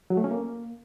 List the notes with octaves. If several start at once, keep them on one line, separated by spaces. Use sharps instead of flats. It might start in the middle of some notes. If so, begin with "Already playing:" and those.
F#3
A3
C#4
A#3